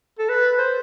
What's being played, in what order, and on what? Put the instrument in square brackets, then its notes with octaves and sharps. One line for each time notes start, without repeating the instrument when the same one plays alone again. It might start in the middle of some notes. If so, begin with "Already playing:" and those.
[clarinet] A4
B4
C5